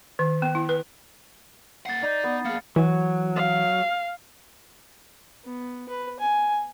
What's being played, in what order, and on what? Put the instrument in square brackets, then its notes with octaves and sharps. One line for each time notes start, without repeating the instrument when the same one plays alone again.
[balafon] D#3
B3
E4
B4
[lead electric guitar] A#3 F#5 [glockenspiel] A6 C7
[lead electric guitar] D#4 [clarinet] D5
[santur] B3
[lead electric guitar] A#3 G#4 [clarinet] F5 [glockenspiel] C#7
[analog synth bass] E3 [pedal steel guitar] F#3
[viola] F5
[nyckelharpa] B3
B4
G#5